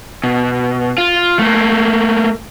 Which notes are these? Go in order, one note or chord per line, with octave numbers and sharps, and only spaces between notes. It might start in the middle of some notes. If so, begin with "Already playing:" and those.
B2
F4
A3 A#3